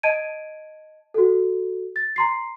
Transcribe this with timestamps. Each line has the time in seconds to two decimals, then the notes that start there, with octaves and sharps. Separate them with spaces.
0.03 D#5 A5 G#6 D7 D#7
1.14 F#4 A4
1.96 A6
2.16 A#5 C6 C7